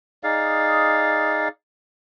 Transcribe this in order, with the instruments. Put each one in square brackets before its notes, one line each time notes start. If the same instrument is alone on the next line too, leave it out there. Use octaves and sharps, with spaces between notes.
[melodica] D#4 G#4 D5 F5